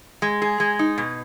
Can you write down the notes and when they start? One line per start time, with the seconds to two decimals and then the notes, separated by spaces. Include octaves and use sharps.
0.22 G#3
0.42 G#4
0.60 G#3
0.79 D#4
0.98 B2